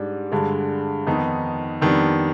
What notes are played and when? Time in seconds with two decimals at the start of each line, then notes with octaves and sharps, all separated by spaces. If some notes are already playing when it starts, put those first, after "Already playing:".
Already playing: G#2 G3 D4
0.32 G2 D3 G#3
1.07 F2 D#3 B3 D#4
1.81 F2 D#3 G3 B3 D4